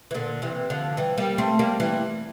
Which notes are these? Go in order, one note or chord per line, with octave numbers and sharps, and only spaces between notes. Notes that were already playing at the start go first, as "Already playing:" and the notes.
E3
A#2 D3
C3 E3
D3 F3
E3 G3
G3 A#3
A3 C4
G3 A#3
E3 G3